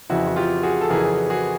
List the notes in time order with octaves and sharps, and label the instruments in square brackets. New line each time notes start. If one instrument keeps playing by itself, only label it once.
[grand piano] F2 C#3 E3 E4 F#4
F#4
F4 G4
F#4 G#4
A4
F2 C#3 E3 G#4 A#4
F#4 G#4